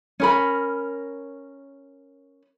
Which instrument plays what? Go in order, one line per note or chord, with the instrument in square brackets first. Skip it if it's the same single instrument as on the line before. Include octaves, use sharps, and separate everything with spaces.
[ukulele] C#4 A#4 B5